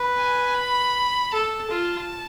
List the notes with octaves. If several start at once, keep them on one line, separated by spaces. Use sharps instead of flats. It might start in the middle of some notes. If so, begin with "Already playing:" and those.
Already playing: B4
G#5
B5
A4 A5
F4